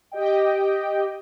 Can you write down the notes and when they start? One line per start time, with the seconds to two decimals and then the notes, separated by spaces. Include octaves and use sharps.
0.12 G4 D#5 G5